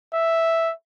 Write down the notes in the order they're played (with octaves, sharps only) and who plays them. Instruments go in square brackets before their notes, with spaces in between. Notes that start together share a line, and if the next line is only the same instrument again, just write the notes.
[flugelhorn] E5